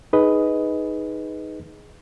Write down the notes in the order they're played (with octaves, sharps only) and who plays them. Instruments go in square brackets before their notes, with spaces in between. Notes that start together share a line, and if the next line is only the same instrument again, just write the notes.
[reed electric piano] D#4 G#4 B4 D#5